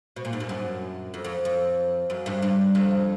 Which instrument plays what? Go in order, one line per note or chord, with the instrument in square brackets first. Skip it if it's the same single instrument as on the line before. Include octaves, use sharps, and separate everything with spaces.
[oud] B2
A#2
G#2
G2
F#2
F2
F2
F2
F#2
G2
G2
F2